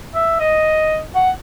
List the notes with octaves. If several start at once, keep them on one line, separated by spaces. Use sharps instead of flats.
E5
D#5
F#5